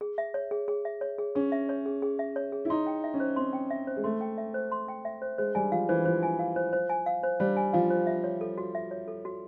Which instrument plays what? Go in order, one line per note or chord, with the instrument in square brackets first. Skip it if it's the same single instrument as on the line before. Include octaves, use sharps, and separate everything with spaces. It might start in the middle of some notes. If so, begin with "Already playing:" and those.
[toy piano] G#4
E5
C#5
G#4
G#4
E5
C#5
G#4
[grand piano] C#4 [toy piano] G#4
[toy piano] E5
C#5
G#4
G#4
E5
C#5
G#4
[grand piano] E4
[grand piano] D#4 [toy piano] C6
[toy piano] G5
E5
[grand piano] C#4
[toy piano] C5
[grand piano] C4 [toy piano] C6
[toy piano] G5
E5
C5
[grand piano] G#3
[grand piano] A3 [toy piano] C6
[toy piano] G5
E5
C5
C6
G5
E5
C5
[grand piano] G#3 [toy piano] C5
[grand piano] G3 [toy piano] G#5
[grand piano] F3 [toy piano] F5
[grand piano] E3 [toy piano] C5
[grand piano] F3 [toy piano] C5
[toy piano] G#5
F5
C5
C5
G#5
F5
C5
[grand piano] G3 [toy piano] C5
[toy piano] G#5
[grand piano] F3 [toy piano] F5
[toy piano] C5
E5
C#5
A4
F#4
E5
C#5
A4
F#4